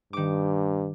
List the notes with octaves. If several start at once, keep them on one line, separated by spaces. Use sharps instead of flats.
G2 D#3 D6